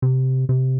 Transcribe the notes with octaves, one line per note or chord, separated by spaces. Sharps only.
C3
C3